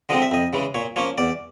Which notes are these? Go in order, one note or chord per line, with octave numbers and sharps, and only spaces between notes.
D3 F3 G#3 C4 D#5
E5
F2 D#5
C#3 E3 G#3
A#2 C#5
F3 A#3 C#4 C#5
E2 D5